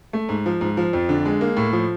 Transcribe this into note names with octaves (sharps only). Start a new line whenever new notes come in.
A3
G#2
F3
G#2
F3
F2
D3
G#3
A#3
A2
F3